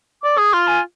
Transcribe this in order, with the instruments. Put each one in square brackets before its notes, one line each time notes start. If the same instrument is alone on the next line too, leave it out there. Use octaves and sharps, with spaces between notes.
[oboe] D5 [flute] D6
[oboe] G#4 [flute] D#6
[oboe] F4 [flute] C6
[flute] G#5